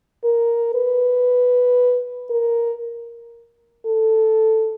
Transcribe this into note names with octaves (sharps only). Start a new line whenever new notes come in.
A#4
B4
A#4
A4